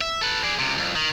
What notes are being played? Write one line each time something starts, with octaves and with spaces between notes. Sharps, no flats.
E5
A4 B4
G#4 D5
C#2 C3
C2 F2
D#3